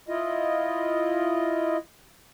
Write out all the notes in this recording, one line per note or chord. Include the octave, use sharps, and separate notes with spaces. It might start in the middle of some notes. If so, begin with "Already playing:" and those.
E4 F4 D#5